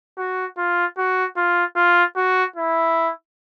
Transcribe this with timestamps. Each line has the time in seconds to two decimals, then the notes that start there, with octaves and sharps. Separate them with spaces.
0.18 F#4
0.57 F4
0.97 F#4
1.36 F4
1.76 F4
2.16 F#4
2.56 E4